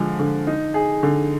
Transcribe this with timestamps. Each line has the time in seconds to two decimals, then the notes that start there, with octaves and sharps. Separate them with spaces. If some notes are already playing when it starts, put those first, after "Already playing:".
Already playing: D3 F3 G#3
0.19 D3
0.47 D#4
0.74 G#4
1.03 D3